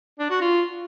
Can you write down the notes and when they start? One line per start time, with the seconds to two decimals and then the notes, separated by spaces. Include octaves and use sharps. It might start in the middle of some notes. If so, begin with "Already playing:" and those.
0.19 D4
0.30 F#4
0.41 F4